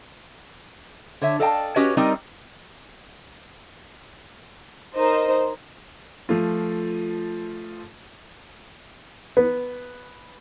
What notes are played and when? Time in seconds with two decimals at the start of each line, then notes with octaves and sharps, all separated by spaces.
1.22 D3 C#5 E5
1.40 A4 D5 D#5 F5 G5 A5
1.76 C#4 F#4 G4 B4 C#5 D#5
1.97 G3 C4 D#4 A#4 D5 D#5
4.95 D#4 A#4 C5 D#5
6.29 F3 A3 F4
9.37 B3